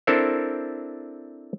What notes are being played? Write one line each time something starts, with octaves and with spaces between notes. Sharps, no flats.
C4 D4 E4 A4 A#4 C5